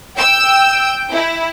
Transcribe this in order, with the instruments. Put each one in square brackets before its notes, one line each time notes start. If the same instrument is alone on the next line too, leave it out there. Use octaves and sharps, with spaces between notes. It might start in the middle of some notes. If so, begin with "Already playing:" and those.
[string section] G5 [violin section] E6
[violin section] E4